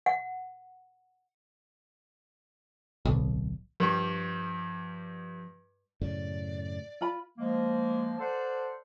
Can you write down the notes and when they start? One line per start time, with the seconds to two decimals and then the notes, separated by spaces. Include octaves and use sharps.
0.06 F#5
3.05 D1 B1
3.80 G2 F3 G3 C#6
6.01 F#2 A2 C#3 D5
7.01 F4 B5
7.38 F3 G#3 A#3
8.19 A4 C5 D5 F#5 A5 C6